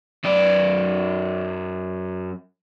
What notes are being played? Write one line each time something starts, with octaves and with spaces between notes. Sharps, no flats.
F#2 D5